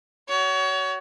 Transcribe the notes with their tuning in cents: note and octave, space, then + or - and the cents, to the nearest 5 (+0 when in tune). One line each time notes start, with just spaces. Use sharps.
F#4 +25 C#5 +30